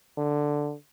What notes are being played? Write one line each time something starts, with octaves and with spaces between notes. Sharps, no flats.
D3